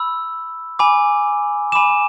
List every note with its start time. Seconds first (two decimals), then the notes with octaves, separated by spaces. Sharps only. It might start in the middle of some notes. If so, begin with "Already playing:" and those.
Already playing: B5 E6
0.79 G#5 B5 D6
1.72 G#5 B5 D6 E7